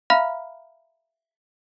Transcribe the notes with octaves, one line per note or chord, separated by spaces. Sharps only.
E5 F5 A#5 B5 F6